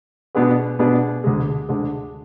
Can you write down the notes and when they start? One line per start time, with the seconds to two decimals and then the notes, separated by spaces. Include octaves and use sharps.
0.35 B2 B3 D4 G#4 B4
0.79 B2 B3 D4 G#4 B4
1.24 D2 D3 G#3
1.69 D2 D3 G#3